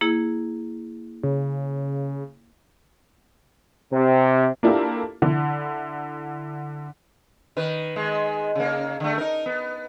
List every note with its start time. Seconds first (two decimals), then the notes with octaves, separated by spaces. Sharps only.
0.01 A#3 E4 G#4
1.23 C#3
3.92 C3
4.63 A#3 D4 E4 F4 G4 A4
5.22 D3 E4
7.57 D#3 B4
7.96 D#3 G#3
8.55 C#3 A#3
9.00 D3 A3
9.18 D#4 A#4
9.46 B3